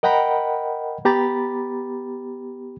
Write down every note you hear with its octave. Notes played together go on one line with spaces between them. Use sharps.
A#4 D#5 F#5 G5 A#5 B5
B3 G4 A#5 B5 A6